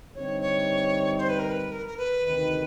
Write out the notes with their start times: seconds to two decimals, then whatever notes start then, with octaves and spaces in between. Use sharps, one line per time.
0.15 G2 D3 G3 C4 D#4 C#5
0.41 C#5
1.18 C5
1.29 B4
1.39 A#4
1.49 B4
1.71 A#4
1.87 A#4
1.97 B4
2.23 D2 C3 D#3